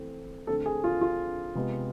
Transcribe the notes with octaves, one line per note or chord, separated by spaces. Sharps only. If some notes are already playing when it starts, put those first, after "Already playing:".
Already playing: E3 A3 C4
D3 A3 C4 A4
G#4
F4
F4
C3 G#3 B3